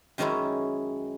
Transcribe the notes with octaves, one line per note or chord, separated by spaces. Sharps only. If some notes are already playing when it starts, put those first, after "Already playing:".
F#2 D#3 G#3 C#4 D#4 E4